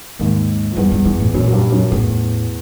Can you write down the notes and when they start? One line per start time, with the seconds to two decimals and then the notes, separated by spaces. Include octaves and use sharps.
0.19 D#2 G#2 D#3
0.72 F3
0.76 E2 G2 E3
0.92 G2
1.05 E2 G2 E3
1.20 A2
1.34 F#2 A#2 F#3
1.48 F#3
1.53 G2 G3
1.72 F#2 F#3
1.91 E2 A2 E3